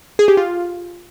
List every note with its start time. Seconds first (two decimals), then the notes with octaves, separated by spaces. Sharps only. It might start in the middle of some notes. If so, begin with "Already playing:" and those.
0.19 G#4
0.28 G4
0.37 F4